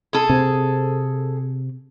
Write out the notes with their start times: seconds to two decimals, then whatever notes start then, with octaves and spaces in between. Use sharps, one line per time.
0.13 G#4 A4
0.30 C3 C4